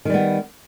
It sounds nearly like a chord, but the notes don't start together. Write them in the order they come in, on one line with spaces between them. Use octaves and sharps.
D#3 G3 B3